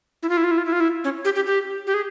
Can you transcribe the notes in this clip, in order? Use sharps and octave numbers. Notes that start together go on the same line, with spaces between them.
E4
F4
E4
F4
E4
F4
E4
F4
E4
C#4
G4
G4
G4
G4
G#4